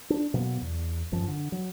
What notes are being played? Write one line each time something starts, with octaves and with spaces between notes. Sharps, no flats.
D4
B2 F#3 A#3 B3
E2
G1 F#2 F3
D3
F#3